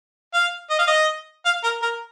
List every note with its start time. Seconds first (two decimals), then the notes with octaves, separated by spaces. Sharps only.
0.34 F5
0.70 D#5
0.79 F5
0.87 D#5
1.46 F5
1.64 A#4
1.82 A#4